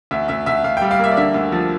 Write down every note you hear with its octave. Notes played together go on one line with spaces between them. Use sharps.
D2 E5
D2 E5
D2 E5
D2 F5
G5
G3
F5
A#3 E5
D5
D3 E5
D2
F3